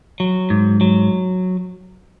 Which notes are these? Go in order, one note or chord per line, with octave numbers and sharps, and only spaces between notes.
F#3
G#2
F#3